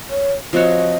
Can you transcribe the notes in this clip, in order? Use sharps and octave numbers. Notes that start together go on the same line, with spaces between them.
C#5
F3 C4 F#4 C#5 D#5